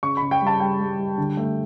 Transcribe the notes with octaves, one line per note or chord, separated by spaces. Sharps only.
C#3 C#6
B5
C#3
G5
G3 A5
G3 G5
G3
G3
D3
A3